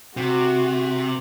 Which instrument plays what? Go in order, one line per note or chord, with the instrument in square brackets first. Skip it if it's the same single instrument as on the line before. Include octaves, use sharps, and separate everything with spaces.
[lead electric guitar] C3 [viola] F#4